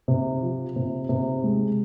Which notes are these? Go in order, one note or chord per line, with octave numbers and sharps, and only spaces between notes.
C3
F3
C3
C3
G#3